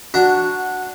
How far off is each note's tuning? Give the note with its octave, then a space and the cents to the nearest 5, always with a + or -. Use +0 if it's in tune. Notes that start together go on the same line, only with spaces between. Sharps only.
D4 +0 F#4 +0 A#5 -5